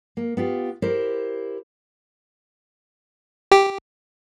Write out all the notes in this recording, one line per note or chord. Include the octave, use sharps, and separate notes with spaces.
A#3
B3 F4 G4
E4 G4 A#4 C5
G4